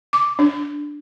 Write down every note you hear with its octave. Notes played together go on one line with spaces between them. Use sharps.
D6
D4